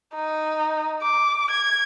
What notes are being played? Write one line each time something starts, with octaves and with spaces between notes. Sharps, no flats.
D#4
D6
G#6